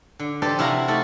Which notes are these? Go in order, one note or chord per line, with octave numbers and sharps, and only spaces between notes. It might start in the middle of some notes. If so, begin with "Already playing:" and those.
D3
G4 A4 B4 C5 D5 D#5
C3 E4 F#4 F5 A#5 B5
A3 D#4 F#4 A4